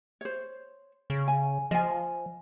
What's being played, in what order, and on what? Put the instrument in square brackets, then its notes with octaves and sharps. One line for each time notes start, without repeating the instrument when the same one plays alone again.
[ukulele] C5 C#5
[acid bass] C#3
[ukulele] G#5
[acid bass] F3 [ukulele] D#5 G#5